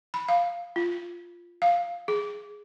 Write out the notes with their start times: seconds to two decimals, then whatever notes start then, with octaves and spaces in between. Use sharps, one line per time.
0.14 B5
0.28 F5
0.76 F4
1.62 F5
2.08 G#4